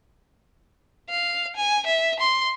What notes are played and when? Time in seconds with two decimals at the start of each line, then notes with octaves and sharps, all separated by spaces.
1.09 F5
1.56 G#5
1.87 E5
2.19 C6